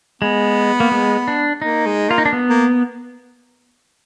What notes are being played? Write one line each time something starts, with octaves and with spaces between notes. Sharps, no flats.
G#3 B3
A#3
G#3
D4
A#3 D#4
G#3
A#3 F4
D#4
D4
B3
A#3